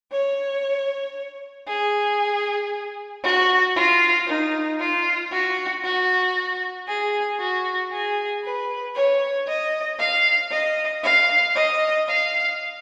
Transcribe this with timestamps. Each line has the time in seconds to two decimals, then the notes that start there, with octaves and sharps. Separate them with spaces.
0.12 C#5
1.67 G#4
3.24 F#4
3.76 F4
4.27 D#4
4.79 F4
5.32 F#4
5.84 F#4
6.88 G#4
7.40 F#4
7.92 G#4
8.44 B4
8.95 C#5
9.47 D#5
9.99 F5
10.51 D#5
11.03 F5
11.55 D#5
12.08 F5